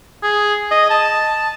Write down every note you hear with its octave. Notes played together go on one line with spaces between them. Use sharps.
G#4
D#5
A5